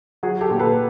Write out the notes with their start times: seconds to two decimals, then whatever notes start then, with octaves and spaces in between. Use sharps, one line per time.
0.23 F#3 F#4 G#4
0.41 G4 A4
0.50 A#2
0.59 A4 B4